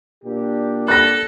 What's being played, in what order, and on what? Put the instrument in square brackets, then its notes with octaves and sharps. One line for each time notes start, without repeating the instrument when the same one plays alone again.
[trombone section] A#2 D4 G4
[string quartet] A4 [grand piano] F#6 A#6